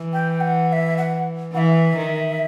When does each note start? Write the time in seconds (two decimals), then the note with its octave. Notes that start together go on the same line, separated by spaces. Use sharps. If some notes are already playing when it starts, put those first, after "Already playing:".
Already playing: E3
0.13 G5
0.41 F#5
0.69 F#5
0.73 E5
0.98 F#5
1.54 E3 F#5
1.58 E5
1.97 D#3